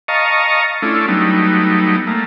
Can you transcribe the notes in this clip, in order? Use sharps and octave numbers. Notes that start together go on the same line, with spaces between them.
D#5 F5 A5 A#5 C#6
A3 C#4 D4 E4 F4 A4
F#3 G3 A3 B3 D#4
A3 A#3